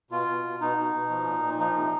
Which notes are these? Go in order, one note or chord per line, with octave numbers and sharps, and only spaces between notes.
B2 F4
B2
B2
B2 D#4
B2
B2
F3
A#2
A#2
F3 D#4
C3